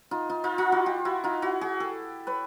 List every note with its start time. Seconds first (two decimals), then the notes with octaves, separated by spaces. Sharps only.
0.11 D#4 F4
0.30 D#4 F4
0.44 D#4 F4
0.58 D#4 F4
0.72 E4 F#4
0.86 F4 G4
1.05 E4 F#4
1.24 D#4 F4
1.42 E4 F#4
1.61 F#4 G#4
1.80 G4 A4
2.27 B4 C#5